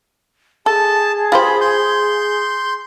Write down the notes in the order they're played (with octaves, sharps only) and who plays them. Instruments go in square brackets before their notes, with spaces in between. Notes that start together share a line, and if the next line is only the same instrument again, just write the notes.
[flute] G#4 [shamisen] A4 [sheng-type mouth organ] A5
[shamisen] F4 G4 C5 [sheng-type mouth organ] B5
[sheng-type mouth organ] C6 G6